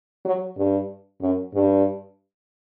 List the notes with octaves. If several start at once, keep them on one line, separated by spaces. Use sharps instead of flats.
F#3
G2
F#2
G2